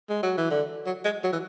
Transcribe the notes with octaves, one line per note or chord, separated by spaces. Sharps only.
G#3
F#3
E3
D3
F#3
G#3
F#3
E3